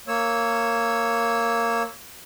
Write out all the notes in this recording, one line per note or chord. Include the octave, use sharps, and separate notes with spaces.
A#3 C#5 E6